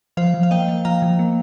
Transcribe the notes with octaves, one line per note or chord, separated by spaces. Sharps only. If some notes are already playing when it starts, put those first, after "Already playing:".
F3 C5 F5
F3
F5
A#3 D#5 G5
A#3
F3 F5 A#5
F3
A#3